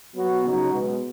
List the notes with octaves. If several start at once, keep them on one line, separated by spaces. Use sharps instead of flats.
F#3 B3 F#4
C#3 F#3 D#4 F#4
B2 G#3 B3